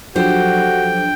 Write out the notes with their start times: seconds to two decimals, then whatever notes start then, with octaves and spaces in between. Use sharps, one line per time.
0.16 F3 F#3 D4 F#4 G4 A4 C5 G5